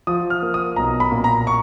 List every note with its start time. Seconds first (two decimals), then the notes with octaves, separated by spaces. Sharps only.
0.07 F3 D#6
0.30 F6
0.42 A#3
0.54 D#6
0.76 B1 A#5
1.00 B5
1.12 A#2
1.24 A#5
1.47 C#6